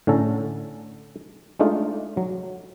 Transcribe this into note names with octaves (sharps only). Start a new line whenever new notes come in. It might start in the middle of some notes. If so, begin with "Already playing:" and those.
A2 D3 C#4 A4 A#5
G#3 A3 D4 D#4 F4
F#3